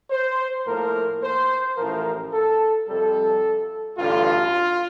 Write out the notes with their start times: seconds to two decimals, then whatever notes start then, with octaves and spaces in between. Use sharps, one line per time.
0.10 C5
0.66 A2 F3 A#3 A#4
1.21 C5
1.76 A1 A2 F3 A#4
2.32 A4
2.87 F2 C3 G3 A4
3.97 A1 G2 D3 F4